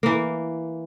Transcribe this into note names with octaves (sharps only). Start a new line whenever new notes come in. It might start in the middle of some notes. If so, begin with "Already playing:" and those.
E3 A#3